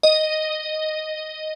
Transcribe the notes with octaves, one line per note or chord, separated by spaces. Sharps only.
D#5